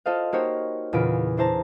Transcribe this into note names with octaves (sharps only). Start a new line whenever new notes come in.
F4 A4 C5 D#5 F5
A#3 D#4 F#4 G4 C5 C#5
E2 A#2 C#3 F4 B6 D7
D4 E4 C5 A5 A#5